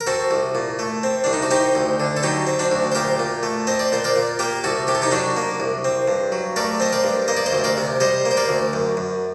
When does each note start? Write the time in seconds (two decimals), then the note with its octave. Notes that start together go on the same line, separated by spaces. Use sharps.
0.01 A#4
0.07 C4 F#4 A4
0.31 C2
0.55 A#2
0.79 A3
1.03 C4
1.24 C2 D4
1.33 D#4
1.42 F#4
1.51 C4 D#4 G4
1.75 D2
2.00 D3
2.17 A4
2.23 F#3 D#4 G4
2.47 C4
2.59 D4 F#4
2.71 D2
2.92 C5
2.95 A#2 G4 A#4
3.19 A#2
3.43 A3
3.67 C4 D#5
3.79 D5
3.92 A#2 C5
4.04 A#4 D5
4.16 A#2
4.39 A#3 G4 A#4
4.64 C2 F#4 A4
4.87 C3 G4
4.95 A4
5.02 D#4 G4
5.11 F#3 D4 F#4
5.37 A#3
5.60 C2
5.84 C4
6.08 G2
6.32 F#3
6.56 A3 A#4 D5
6.80 C4 D#5
6.93 A#4 D5
7.04 G2
7.28 A#3 D#5
7.37 D5
7.46 C5 D#5
7.53 D2
7.64 A#4 D5
7.77 C3
8.00 G3 C5 D#5
8.25 A#3
8.31 C5
8.37 A#4 D5
8.49 D2
8.73 F#2
8.97 F#2